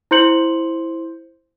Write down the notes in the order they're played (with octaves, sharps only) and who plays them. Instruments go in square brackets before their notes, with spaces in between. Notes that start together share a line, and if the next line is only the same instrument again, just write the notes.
[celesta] E4 C5 C6 G6 C#7 F#7